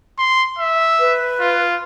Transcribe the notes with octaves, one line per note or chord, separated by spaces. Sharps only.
C6
E5
B4
F4